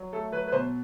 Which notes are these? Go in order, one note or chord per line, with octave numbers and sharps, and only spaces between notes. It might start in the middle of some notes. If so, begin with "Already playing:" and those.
Already playing: F#3
A3 A4
F#3 B4
B4
B2 C5